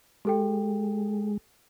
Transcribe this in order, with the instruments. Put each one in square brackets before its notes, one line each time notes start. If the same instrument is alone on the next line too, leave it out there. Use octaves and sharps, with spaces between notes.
[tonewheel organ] G#3 [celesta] G4 A4 G5